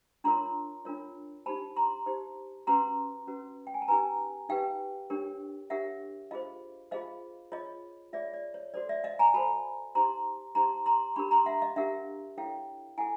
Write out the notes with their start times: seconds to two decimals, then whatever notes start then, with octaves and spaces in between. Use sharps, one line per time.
0.24 D4 F4 A#4 C#5 A#5 C6
0.85 D4 F4 A#4 C#5
1.46 D#4 G4 C5 A5 B5
1.76 A#5 C6
2.06 D#4 G4 C5
2.67 C#4 F#4 B4 A#5 C6
3.27 C#4 F#4 B4
3.67 G5
3.74 G#5
3.82 A5
3.88 D#4 G4 B4 G#5 A#5
4.49 D#4 G4 B4 F5 G5
5.10 D4 G4 A#4 C#5
5.70 D4 G4 A#4 C#5 E5 F#5
6.31 F4 G#4 C5 D#5 F5
6.91 F4 G#4 C5 D#5 F5
7.52 F4 G#4 C#5 D#5
8.13 F4 G#4 C#5 D5 E5
8.34 D5
8.54 C#5
8.74 F#4 A4 C5 D5
8.89 D5 E5
9.04 D#5 F5
9.19 G#5 A#5
9.34 F#4 A4 C5 A5 B5
9.95 D#4 G4 C5 A#5 C6
10.55 D#4 G4 C5 A#5 C6
10.86 A#5 C6
11.16 D4 G4 A#4 B5 C#6
11.31 A#5 C6
11.46 E5 F#5
11.62 D#5 F5
11.76 D4 G4 A#4 E5 F#5
12.37 E4 A4 C#5 F5 G5
12.98 E4 A4 F#5 G#5